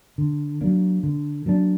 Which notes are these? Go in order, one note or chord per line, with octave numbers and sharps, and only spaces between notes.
D3
F#3 A#3 D4
D3
F#3 A#3 D4